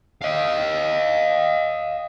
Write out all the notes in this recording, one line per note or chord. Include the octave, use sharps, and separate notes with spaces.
D#5 F5